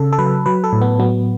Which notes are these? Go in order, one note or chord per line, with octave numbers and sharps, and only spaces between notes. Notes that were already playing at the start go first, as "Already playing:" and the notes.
Already playing: C#3 A4
A4
F#3 B4
F#3 B4
A4
A2
B3
F#3 B3